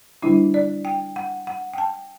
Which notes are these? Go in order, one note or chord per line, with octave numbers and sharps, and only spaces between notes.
D3 G3 D4 E4
D5
G5
F#5
F#5
G5
A5